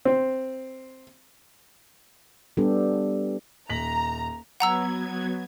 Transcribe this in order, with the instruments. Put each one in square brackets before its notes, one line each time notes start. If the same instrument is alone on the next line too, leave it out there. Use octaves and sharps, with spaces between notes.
[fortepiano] C4
[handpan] G3 B3 D4 G4 A4
[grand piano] D#1 B6 F#7 [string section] A#5
[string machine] F#3 B3 G#6 [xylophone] F#5 A#5 E6